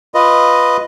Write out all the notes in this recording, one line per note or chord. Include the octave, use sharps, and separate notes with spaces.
F4 B4 D#5